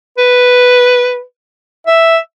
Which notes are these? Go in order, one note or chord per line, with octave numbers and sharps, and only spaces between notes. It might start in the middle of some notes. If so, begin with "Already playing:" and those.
B4
E5